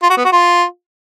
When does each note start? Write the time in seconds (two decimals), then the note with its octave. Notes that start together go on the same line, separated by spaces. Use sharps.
0.03 F4
0.10 F#4
0.17 B3
0.25 F#4
0.32 F4